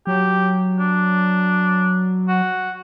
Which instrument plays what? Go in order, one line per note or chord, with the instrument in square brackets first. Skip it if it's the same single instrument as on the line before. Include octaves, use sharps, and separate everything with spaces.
[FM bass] F#3 [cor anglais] G4
[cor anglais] D4
F#4